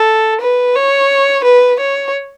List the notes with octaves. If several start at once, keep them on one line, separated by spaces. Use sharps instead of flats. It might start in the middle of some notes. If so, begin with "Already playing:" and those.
Already playing: A4
B4
C#5
B4
C#5